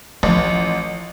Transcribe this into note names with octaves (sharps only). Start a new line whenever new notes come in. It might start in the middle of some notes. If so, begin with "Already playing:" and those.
A1 F3